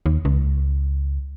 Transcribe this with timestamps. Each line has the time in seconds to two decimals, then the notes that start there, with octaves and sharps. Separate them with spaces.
0.06 D#2
0.25 C#2